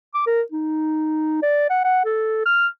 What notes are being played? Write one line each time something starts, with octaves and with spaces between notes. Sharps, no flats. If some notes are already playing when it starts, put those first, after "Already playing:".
D6
A#4
D#4
D5
F#5
F#5
A4
F6